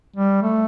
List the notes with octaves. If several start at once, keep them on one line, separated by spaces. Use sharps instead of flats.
G3
A3